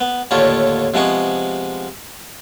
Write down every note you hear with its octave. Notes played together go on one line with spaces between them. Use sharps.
B3
D#2 A2 D3 A3 F4 C#5
C3 F3 G#3 B3 G#4 C#6